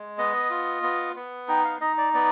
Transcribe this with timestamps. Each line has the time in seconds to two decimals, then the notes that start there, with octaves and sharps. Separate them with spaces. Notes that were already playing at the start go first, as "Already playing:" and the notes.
Already playing: G#3
0.18 B3 D#5
0.50 F4
0.83 B3
1.16 B3
1.48 D#4 G5
1.65 F5
1.81 D#4 D#5
1.98 D5
2.14 B3 D5